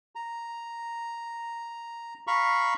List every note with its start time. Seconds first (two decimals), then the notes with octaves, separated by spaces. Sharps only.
0.15 A#5
2.27 F5 A#5 B5 C#6